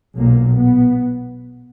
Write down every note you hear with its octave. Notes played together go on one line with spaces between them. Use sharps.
B1 A#2 A#3
B3